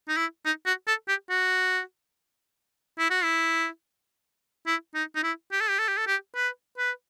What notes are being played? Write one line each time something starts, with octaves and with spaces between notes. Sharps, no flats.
D#4
E4
D#4
F#4
A4
G4
F#4
E4
F#4
E4
E4
D#4
D#4
E4
G4
A4
G4
A4
G4
A4
G4
B4
B4